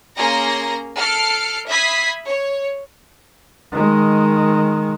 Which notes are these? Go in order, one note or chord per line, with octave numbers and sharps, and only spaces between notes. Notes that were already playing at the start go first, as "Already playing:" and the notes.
A#3 C#4 G#4 A#5 C6 A#6
A4 F6 C7 D7
E5 B5 D#6 G#6 B6 C7
C#5
D#3 G#3